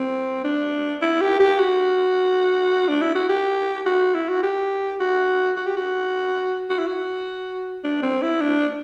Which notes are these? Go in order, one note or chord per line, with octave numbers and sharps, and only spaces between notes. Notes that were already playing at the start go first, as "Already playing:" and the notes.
Already playing: C4
D4
E4
G4
G4
F#4
D4
E4
F#4
G4
F#4
E4
F#4
G4
F#4
F#4
G4
F#4
F#4
E4
F#4
D4
C4
E4
D4